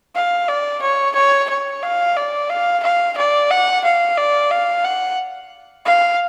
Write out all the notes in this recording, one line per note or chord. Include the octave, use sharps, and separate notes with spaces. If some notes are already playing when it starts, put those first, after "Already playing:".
F5
D5
C#5
C#5
C#5
F5
D5
F5
F5
D5
F#5
F5
D5
F5
F#5
F5